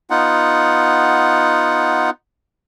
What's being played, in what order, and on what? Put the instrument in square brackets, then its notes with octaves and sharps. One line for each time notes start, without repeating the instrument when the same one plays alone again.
[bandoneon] B3 D#4 F4 F#5